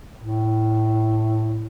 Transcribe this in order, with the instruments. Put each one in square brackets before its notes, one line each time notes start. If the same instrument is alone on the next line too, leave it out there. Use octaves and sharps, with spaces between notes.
[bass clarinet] A2